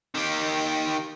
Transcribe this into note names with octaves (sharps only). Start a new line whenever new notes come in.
D#3 G4